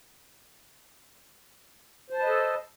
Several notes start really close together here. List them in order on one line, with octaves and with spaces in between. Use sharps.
C5 A5 B4 D#5 A4